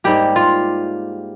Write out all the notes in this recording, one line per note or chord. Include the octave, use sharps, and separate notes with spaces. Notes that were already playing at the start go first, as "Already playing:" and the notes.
G#2 G3 A#3 G4
F4